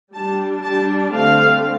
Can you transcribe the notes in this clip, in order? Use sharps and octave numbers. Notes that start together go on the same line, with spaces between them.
G3 D4 A5
G3 D4 A5
D3 A3 C4 F5